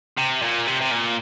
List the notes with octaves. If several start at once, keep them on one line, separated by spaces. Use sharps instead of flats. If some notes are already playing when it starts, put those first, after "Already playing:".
C3
A#2
C3
C3
A#2